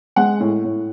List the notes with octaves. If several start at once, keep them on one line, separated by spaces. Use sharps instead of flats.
G#3 F#5
A2
A2